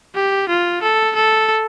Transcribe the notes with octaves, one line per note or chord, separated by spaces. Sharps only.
G4
F4
A4
A4